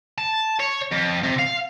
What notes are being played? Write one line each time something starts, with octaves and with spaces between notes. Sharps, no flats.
A5
C#5
F2
C3
F5